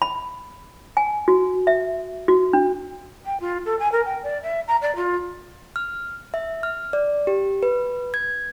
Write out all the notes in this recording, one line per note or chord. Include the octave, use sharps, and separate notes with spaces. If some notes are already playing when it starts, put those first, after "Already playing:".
B5
G#5
F#4
E5
F#4
D4
G5
F4
A4
G#5
A#4
G5
D5
E5
A#5
D5
F4
F6
E5
F6
D5
G4
B4
G#6